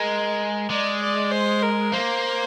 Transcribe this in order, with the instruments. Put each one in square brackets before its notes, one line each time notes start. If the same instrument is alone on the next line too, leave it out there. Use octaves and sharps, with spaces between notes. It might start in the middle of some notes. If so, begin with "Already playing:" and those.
Already playing: [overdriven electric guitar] G#3 [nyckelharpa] A#4
[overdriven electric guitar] G#3 [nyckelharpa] D5
[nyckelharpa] D5
C5
A#4
[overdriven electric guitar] A#3 [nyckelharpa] C5